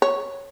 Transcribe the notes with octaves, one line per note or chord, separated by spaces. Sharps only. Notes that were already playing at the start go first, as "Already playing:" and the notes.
C#5